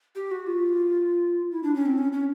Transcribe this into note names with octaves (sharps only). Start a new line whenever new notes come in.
G4
F#4
F4
E4
D4
C#4
C4
C#4
C#4